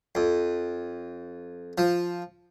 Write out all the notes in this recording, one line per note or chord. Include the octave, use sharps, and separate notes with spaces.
F2
F3